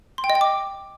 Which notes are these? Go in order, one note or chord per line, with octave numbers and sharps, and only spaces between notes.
C6
G5
D#5
G5
D6